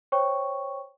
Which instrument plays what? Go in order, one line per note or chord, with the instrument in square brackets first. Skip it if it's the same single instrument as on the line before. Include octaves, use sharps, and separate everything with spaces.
[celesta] C5 C#5 G5 C#6